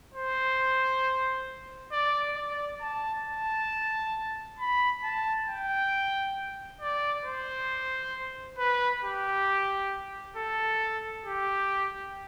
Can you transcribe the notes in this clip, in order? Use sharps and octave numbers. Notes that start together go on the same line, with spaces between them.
C5
D5
D5
A5
A5
B5
A5
G5
D5
C5
B4
G4
A4
G4